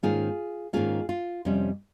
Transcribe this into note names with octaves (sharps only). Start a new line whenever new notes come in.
G#2 D#3 A#3 C#4 F4 G#4
G#2 D#3 A#3 C#4 F4 G#4
F4
F2 C3 G3 C#4